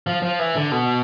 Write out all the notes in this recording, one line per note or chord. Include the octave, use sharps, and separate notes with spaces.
F3
F3
E3
D3
B2